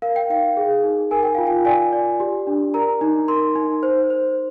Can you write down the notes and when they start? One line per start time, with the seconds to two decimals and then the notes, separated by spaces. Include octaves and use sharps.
0.02 A#4 F5
0.16 G5
0.30 D#4 F5
0.57 G#4
0.84 D#4
1.11 A#4 G#5
1.23 G5
1.35 F4 F5
1.47 G5
1.65 D5 G#5
1.93 D5
2.20 G4
2.47 D4
2.74 A#4 A#5
3.01 D#4
3.28 A#4 C6
3.56 D#4
3.83 C5
4.10 C5